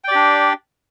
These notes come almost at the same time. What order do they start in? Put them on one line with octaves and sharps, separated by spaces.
G5 D5 G4 D4